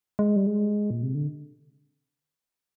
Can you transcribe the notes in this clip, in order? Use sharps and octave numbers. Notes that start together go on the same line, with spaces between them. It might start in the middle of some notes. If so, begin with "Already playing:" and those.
G#3
G3
G#3
A#2
C3
D3